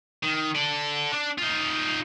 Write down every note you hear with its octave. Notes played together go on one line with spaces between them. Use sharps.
D#3
A4 D5
D4
D#4 F4